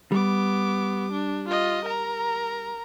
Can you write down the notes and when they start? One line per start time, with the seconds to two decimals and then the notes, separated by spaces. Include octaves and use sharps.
0.12 G3 B3 D6
1.12 D4
1.48 F4 D#5
1.84 A#4 A#5